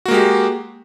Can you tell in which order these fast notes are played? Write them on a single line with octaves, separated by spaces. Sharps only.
F#4 A#3 G#3 G4